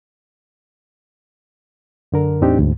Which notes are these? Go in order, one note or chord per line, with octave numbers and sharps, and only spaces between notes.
F#2 D3 A#4
E2 A2 C4 D4 D#4 G4
D2 G#2